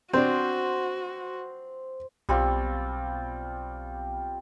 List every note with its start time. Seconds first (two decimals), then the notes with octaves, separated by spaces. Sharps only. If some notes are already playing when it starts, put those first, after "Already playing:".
0.13 C4 D4 F#4 C5
2.29 B1 G3 C4 F4